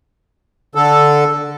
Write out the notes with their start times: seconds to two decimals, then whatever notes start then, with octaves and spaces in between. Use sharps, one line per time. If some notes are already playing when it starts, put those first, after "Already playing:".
0.75 D3 A4